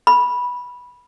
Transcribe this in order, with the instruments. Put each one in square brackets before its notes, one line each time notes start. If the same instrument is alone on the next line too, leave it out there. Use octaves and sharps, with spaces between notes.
[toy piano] B5